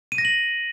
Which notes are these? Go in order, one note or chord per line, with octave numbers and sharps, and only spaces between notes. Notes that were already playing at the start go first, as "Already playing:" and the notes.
D#7
A#6
F#7